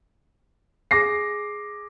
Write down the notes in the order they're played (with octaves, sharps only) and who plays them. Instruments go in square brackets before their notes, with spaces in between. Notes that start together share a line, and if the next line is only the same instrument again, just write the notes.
[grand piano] G#4 D6 A#6 C7